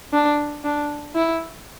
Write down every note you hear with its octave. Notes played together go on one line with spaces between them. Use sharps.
D4
D4
E4